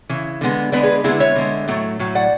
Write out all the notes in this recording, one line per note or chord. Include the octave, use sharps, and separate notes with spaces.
C#3 E3
D3 G#3 B3
D3 G#3 B3 B4 D5
G#4 B4
D3 G#3 B3 E4 G#4
C#5 E5
D3 G#3 B3
A2 F#3 A3
A2 F#3
D5 F#5